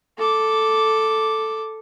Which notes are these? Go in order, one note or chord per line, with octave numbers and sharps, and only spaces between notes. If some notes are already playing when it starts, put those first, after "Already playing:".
A4 D6